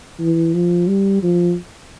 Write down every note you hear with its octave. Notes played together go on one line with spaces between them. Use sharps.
E3
F3
G3
F3